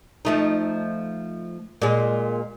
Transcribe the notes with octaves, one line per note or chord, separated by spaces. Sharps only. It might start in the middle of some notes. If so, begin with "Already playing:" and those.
F3 A3 D#4
A#2 G#3